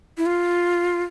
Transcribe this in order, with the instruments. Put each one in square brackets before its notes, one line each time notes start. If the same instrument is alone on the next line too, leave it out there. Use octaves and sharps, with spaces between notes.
[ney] E4
F4